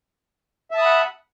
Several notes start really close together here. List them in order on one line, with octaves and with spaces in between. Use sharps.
E5 A5 D#6 B5 F#5